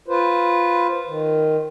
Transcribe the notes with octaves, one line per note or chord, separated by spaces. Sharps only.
F4 B4 C5
D#3